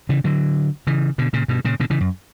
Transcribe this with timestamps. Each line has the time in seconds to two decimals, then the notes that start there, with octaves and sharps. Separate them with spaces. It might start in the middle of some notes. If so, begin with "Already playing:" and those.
0.09 C#3 E3
0.24 D3 F#3
0.87 C#3 E3
1.18 B2 D3
1.33 A#2 C#3
1.48 G2 B2
1.65 A#2 C#3
1.80 B2 D3
1.90 C#3 E3
2.01 F#2